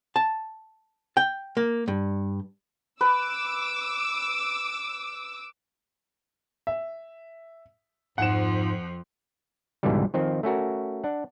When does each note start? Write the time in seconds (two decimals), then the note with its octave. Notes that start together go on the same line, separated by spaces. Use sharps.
0.16 A5
1.17 G5
1.57 A#3
1.88 G2
3.01 B4 D6 E6
6.67 E5
8.18 F2 G#2 F3 F#5 E7
9.83 C#2 G#2 B2 D3 E3 G3
10.14 D#3 F3 C4
10.43 A3 C#4 F#4 A#4
11.04 D4 F#5